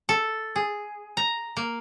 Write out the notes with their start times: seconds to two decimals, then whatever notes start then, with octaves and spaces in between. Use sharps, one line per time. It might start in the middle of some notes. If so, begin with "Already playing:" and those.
0.09 A4
0.56 G#4
1.17 A#5
1.57 A#3